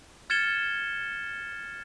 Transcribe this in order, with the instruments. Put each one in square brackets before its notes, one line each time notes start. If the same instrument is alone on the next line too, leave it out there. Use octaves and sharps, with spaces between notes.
[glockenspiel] F6 G#6 A6 C#7 E7 G7